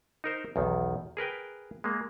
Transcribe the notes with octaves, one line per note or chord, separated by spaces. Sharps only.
D#4 A#4 C5
B1 E2 D#3
G#4 A#4 B4 G5
G#3 A#3